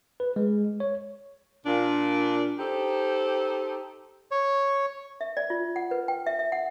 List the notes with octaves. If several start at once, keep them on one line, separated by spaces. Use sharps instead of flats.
B4
G#3
C#5
A#2 D4
D#4 G4 A4 C5
C#5
E5
D5
F4
F#5
B4
G5
E5
E5
F#5